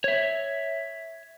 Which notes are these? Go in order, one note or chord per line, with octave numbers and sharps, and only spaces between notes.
C#5 E5